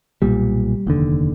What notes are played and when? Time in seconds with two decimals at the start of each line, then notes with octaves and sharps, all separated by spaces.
0.22 B1 A#2 G3
0.87 F1 D#2 D3